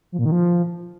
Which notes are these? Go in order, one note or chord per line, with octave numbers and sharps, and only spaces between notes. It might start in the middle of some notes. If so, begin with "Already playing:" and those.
F3
A#2
D#3
F3